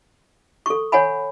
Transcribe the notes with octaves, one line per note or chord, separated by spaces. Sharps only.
A4 C#6
C#5 F#5 G#5 B5